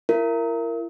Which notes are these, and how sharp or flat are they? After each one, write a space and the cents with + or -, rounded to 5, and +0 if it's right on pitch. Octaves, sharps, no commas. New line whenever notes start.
E4 +35 A#4 -10